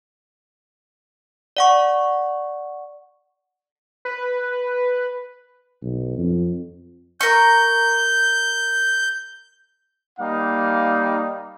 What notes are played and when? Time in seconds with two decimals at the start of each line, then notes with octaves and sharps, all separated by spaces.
1.57 D5 F#5 C#6
4.05 B4
5.82 B1
6.18 F2
7.21 A#4 C#6 G6
10.19 G3 A#3 D#4 F5